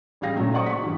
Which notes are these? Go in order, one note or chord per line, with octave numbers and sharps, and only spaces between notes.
A1 G3 G#4 F5 A#6
A#2 C#3 F#3 A3
G#4 C5 D5 F#5 C#6 D#6
C#6 B6
G2 E3